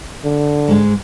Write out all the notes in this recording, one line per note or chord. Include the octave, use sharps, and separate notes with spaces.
D3
G#2 G#3